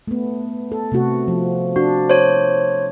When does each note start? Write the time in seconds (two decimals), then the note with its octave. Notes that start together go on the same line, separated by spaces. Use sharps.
0.08 A3 B3
0.72 A4
0.92 C3 A3 F#4
1.28 F3
1.76 D4 F#4
2.10 C5 C#5